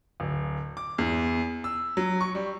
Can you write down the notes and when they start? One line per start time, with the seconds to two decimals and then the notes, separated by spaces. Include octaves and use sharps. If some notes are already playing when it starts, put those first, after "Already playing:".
0.20 D1
0.77 D6
0.98 E2
1.64 E6
1.97 F#3
2.21 C#6
2.35 G3